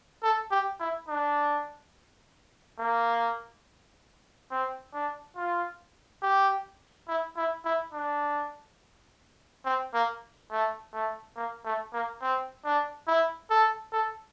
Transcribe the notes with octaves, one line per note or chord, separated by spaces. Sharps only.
A4
G4
E4
D4
A#3
C4
D4
F4
G4
E4
E4
E4
D4
C4
A#3
A3
A3
A#3
A3
A#3
C4
D4
E4
A4
A4